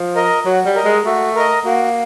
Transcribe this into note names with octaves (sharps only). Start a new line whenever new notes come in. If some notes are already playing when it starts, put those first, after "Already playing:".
Already playing: F3
A#4 D#5
F#3 F#4
G3
A#4 D#5
G#3
A3 F#4
A#4 D#5
A#3 F#4